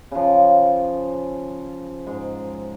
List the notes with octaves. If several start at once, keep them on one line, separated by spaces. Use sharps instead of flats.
C#3 F3
G#2